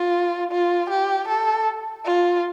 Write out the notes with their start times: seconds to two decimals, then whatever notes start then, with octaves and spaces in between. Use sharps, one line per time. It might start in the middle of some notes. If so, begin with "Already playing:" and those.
Already playing: F4
0.51 F4
0.90 G4
1.28 A4
2.05 F4